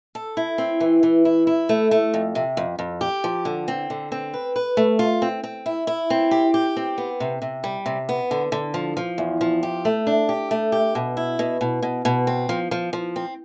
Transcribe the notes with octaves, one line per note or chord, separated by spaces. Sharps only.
A4
E4
C4
E3
E3
E4
E4
A3
A3
F2
C3
F2
F2
G4
F3
D3
C4
D3
C4
B4
B4
A3
F4
C4
C4
E4
E4
C4
G4
G4
C4
B3
C3
C3
G3
C3
B3
D3
D3
F3
F3
E2
F3
G4
A3
D4
G4
A3
G4
B2
E4
B2
B2
B2
B2
C4
F3
F3
F3
C4